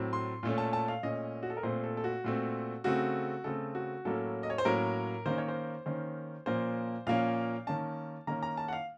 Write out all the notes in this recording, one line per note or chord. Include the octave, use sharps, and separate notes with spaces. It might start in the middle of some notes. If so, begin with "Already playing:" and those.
Already playing: A2 F#3 C4
C6
A#2 A3 C#4
A5
A5
F5
A#2 A3 C#4 D#5
F#4
A4
A#4
A#2 A3 C4 C5
A4
A4
F#4
A#2 A3 C4
C#3 A3 C4 F#4
C#3 A3 C4 A4
F#4
A2 F#3 A#3 C#4 A4
D#5
C#5
C5
A2 F#3 A#3 C#4 A#4
D#3 A#3 C#4 C5
C#5
C5
D#3 A#3 C#4 C5
A#2 F3 A#3 C#4 C5
A#2 F3 A#3 C#4 F5
D#3 A#3 C#4 A5
D#3 A#3 C#4 A#5
A#5
A5
F#5
F5